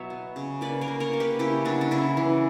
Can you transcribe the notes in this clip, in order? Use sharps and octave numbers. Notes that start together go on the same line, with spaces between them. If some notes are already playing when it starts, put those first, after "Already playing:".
Already playing: B2 F#3 C#5 E5
B3
C#3
A#3 B4 D5
A#4 C#5
A#3
A#4 C#5
A#3
G4 B4
C#3 E4 G4
F#3 D4 F#4
D4
C#3 C#4 E4
E3